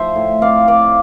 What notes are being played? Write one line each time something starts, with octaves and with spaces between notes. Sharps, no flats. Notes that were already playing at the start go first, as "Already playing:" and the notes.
Already playing: F3 C5 E5
A2
C4 D5 F5
F4 D5 F5